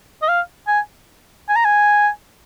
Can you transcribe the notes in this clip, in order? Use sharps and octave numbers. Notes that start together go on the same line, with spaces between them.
D#5
F5
G#5
G#5
A#5
G#5